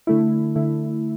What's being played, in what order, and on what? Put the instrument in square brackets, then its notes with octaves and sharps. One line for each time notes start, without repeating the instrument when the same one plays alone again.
[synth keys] D3 A3 E4
D3 A3 E4